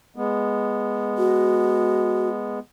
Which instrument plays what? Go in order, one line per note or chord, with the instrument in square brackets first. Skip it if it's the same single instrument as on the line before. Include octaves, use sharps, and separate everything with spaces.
[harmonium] G#3 B3
[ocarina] F#4